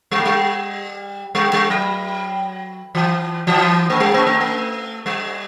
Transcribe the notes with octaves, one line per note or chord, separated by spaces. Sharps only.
G3
A3
G3
G3
G3
F#3
E3
E3
A3
G3
A3
A3
A3
G3